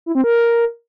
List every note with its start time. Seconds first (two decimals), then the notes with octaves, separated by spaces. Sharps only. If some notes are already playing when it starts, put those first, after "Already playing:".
0.06 E4
0.15 C4
0.24 A#4